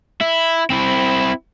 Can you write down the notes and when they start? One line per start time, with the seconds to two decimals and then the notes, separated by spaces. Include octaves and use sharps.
0.21 E4
0.70 C4 E4